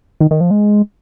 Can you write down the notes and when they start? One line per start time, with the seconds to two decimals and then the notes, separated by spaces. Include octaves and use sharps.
0.21 D#3
0.31 D#3
0.41 F3
0.51 G#3